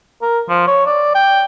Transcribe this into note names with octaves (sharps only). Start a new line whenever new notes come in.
A#4
F3
C#5
D5
G5